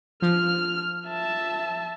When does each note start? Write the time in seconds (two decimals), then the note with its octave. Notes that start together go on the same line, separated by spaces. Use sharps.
0.22 F3 F6
1.08 E5 A5